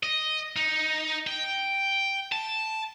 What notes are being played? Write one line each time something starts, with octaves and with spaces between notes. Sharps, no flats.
D#5
D#4
G5
A5